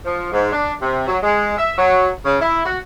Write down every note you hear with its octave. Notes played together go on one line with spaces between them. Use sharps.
F3
G#2
D4
C3
F#3
G#3
E5
F#3
C#3
E4
F#4